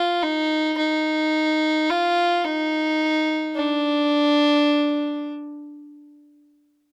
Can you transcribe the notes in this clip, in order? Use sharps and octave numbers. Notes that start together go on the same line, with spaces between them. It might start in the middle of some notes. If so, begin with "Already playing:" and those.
Already playing: F4
D#4
D#4
F4
D#4
D4